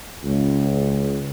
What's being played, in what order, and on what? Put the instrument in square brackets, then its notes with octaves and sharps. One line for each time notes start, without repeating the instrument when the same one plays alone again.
[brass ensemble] C#2